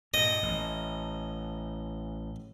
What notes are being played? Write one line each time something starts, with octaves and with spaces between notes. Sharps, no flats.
G2 A#2 D#5
A1